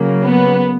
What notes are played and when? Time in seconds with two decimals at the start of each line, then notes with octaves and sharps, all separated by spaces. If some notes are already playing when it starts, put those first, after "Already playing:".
Already playing: C#3 F#3 A#3
0.24 B3